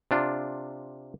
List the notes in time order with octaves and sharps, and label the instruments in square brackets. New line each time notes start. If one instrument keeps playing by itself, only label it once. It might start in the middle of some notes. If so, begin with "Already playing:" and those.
[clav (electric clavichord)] C3 D4 F4